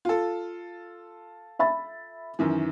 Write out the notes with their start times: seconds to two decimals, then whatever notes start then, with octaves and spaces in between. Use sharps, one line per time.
0.05 F4 A4
1.59 E5 B5 A6
2.39 F#2 D#3 E3